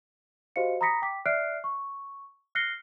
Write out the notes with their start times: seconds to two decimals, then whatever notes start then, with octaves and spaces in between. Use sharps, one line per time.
0.56 F#4 G4 C5 D#5 F5 C#7
0.81 A#5 B5 D#6 A#6 B6 C#7
1.02 G5 D6 B6
1.26 D5 E5 F6 F#6 C7 D7
1.64 C#6
2.55 F6 F#6 A#6 C7 C#7 G7